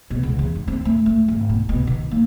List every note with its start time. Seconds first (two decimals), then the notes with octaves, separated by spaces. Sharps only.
0.10 B2
0.23 C#2
0.39 E2
0.55 D#3
0.67 C4
0.85 A3
1.06 A3
1.28 G#1
1.49 B2
1.69 B2
1.87 D#3
2.11 A#3